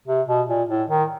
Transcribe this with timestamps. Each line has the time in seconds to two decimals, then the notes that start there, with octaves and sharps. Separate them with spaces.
0.08 C3
0.28 B2
0.48 A#2
0.69 A2
0.90 D#3